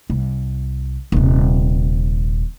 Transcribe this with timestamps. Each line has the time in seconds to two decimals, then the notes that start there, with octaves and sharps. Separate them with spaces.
0.10 C2
1.12 D#1 C3